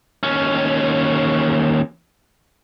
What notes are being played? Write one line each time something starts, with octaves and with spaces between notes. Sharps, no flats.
D#2 C#4